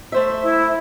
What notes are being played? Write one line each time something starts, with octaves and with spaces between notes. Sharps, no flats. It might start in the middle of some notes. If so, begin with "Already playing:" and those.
A3 C5 E5
E4